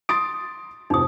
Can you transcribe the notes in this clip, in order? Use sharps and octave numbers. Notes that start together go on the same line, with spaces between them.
C6 D#6 A6 D7
F1 F2 D#4 D#6